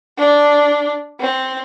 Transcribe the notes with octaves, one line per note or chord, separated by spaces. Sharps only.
D4
C4